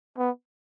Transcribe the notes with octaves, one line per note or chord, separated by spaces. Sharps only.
B3